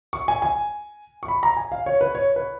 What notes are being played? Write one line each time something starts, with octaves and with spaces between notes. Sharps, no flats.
C#6
G#5
G#5
C#6
B5
A#5
G#5
F5
C#5
B4
C#5
B4